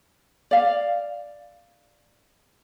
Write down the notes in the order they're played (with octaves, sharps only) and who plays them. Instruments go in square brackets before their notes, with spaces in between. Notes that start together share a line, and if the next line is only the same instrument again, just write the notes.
[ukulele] D5 F5